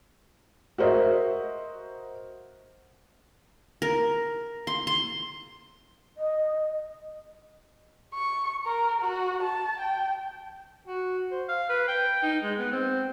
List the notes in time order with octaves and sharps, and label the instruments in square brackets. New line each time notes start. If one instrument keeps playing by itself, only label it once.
[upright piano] F#4 A#4 C5 D#5 E5
[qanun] A#4
C6
C6
[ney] D#5
[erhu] C#6
A#4
F#4
A5
G5
[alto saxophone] F#4
C5
F5
B4
G5
D#4
G#3
B3
C4